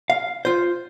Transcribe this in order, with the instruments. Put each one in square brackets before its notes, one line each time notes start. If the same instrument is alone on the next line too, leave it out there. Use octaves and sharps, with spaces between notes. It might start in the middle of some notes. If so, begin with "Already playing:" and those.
[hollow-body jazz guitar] F5
F4 C5